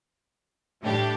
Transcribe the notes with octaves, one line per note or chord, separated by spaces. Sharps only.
A2 G3 D4 G4